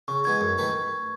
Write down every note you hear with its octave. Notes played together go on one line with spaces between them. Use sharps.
C#3 C#6
G#3 B3 E4 G#6
F#2 G#6
D#3 A3 E4 B4